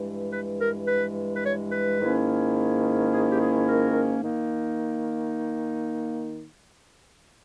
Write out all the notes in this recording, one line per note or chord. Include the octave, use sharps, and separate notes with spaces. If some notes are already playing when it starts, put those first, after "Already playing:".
Already playing: G2 E3 G#3
B4
A#4
B4
B4
C#5
B4
G#2 D#3 A#3 C#4 E4
G#4
G4
G#4
A#4
D#3 A#3 D#4